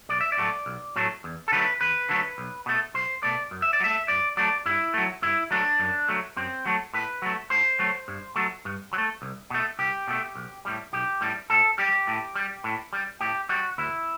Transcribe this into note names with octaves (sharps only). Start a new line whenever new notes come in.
B1 D5
E5
D5
A2 F#3 A3
B1
A2 F#3 A3
E2
A4
D3 F#3 A3 B4
E2 B4
D3 F#3 A3
B1
B2 A3
B1 C5
B2 A3 D5
F#2
E5
D5
F#3
A3 E5
F#2 D5
F#3 A3 D5
G2 E4
F#3 A3
G2 E4
F#3 A3 D4
F#2
F#3 A3
F#2 C4
F#3 A3
A2 B4
F#3 A3
A2 C5
F#3 A3
G2
F#3 A3
G2
F#3
A3
C2
B2 A3
C2 G4
B2 A3
B1
A2 G3
B1 G4
A2 G3
A2 A4
G3 G4
A2
G3
A2
G3
A2 G4
G3 F#4
D2 E4